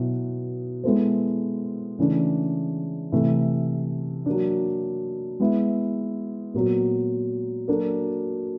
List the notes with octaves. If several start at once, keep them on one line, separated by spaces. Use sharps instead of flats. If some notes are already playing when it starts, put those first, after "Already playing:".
Already playing: B2 F#3 B3 E4
G#3 B3 E4 A4 C5
C#3 E3 A3 D4
C3 E3 A3
F#3 A#3 D4
G#3 B3 E4
A#2 F#3 B3
F#3 A#3 D4 F#4 A4